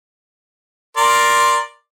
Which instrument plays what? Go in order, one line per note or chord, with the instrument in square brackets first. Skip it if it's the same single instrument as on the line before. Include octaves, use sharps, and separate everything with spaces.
[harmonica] A#4 D5 C6